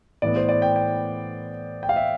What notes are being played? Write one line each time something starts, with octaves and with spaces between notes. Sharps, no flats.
A2 E3 B3 D5
C5
D5
G5
G5
G5
F5
E5